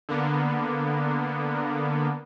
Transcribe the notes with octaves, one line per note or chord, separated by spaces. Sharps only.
D3 A#3 B3